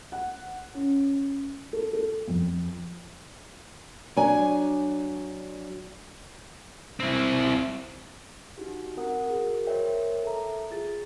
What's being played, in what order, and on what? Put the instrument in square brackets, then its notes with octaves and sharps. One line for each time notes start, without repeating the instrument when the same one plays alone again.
[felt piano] F#5
C#4
A4
A4
F2
[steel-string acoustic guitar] F#3 D4 G#5
[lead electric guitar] C4 E4
[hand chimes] D#4 F#4 G4
C4 A#4 F#5 D#6
F#4 G#4 A#4
A#4 C5 C#5 D#5 E5 G5
A4 E5 A#5
F4 G#4 A6